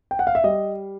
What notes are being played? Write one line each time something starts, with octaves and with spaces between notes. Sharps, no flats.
G5
F#5
F5
E5
G3 D#5